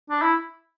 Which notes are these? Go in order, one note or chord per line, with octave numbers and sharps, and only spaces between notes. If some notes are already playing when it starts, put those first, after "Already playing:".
D4
E4